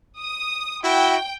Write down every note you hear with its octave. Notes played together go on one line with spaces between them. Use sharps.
D#6
E4 F#4 G5